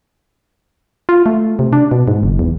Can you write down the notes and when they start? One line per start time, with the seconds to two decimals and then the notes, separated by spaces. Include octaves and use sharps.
1.09 F4
1.26 A3
1.59 C3
1.73 D4
1.91 B2
2.08 G#2
2.23 F#1
2.39 E2